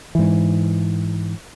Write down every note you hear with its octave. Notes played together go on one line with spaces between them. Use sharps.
G#2 E3